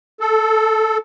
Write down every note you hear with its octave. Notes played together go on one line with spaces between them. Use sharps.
A4